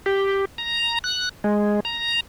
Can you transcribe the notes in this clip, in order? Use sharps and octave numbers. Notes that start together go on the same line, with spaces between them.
G4
A#5
F#6
G#3
A#5